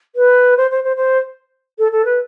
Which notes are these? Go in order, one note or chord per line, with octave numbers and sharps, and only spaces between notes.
B4
C5
C5
C5
C5
A4
A4
B4